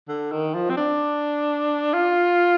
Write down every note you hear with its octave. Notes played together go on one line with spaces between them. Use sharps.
D3
D#3
F3
C4
D4
F4